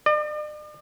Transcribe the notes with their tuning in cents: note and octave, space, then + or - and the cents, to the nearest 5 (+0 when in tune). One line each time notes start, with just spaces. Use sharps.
D5 +45